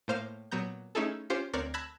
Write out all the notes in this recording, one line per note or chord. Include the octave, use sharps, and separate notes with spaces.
A2 A#3 C5 F5 F6
A#2 F#3 B3 A#5 G6
A3 C#4 D#4 E4 G#4 A4
C#4 F4 G4 C5
D2 C4 A#4 C#5 D5 F#6
A5 B5 E6 F#6 G#6 A#6